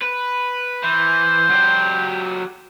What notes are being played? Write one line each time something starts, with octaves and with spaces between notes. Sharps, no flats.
B4
E3 C5
F#3 G4